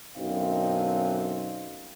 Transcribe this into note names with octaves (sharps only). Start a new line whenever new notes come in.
F#2 B2 D3 C4 D#4 F5